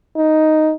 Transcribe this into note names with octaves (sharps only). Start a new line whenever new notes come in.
D#4